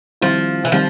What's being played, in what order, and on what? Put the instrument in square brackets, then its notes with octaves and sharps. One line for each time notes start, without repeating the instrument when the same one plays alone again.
[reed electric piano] D#3 G3 C4 E4 [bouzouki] F3
[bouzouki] E3
[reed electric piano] D#3 G3 C4 [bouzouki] F3